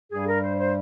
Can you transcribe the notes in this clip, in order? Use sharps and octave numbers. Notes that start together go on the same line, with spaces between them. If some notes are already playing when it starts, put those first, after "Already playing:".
G2 G3 G#4
A#4
C5
C5